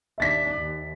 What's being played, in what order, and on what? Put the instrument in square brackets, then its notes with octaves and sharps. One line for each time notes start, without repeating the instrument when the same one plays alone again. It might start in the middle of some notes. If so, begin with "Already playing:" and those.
[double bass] D#2 D4 [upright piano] E5 A6 B6
[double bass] D#2